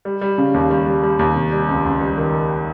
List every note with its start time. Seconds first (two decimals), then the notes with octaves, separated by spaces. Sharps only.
0.05 G3
0.21 G3
0.38 C#3
0.54 D#2
0.70 G3
0.86 G3
1.03 G3
1.19 D#2
1.36 C3
1.52 G3
1.68 C#2
1.84 C#2
2.01 G3
2.18 D#3